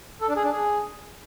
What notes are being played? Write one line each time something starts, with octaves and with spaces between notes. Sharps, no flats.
A4
D4
G#4
D4
G#4